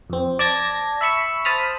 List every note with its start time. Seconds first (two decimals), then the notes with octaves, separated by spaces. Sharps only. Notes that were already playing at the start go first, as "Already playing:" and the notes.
0.10 F2 C4
0.39 D5 A5 G#6 A#6
1.01 E5 B5 C#6 E6
1.45 C5 A5 B5 D#6 F6 B6